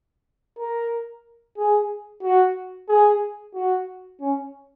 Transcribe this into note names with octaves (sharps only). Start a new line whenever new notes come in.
A#4
G#4
F#4
G#4
F#4
C#4